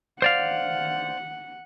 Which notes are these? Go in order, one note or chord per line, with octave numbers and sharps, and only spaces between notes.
C5 D5 F5 F#5